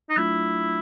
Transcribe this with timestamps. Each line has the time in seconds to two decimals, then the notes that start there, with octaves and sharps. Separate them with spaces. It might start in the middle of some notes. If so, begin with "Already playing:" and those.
0.10 D#4
0.17 F#3 A3 D4 E4 F4